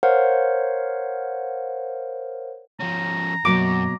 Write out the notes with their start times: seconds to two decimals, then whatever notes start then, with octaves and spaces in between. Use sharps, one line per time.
0.03 A#4 C5 C#5 F5 F#5
2.80 F3 C#4 A#5
3.45 F#2 B2 F#3 A#3 D6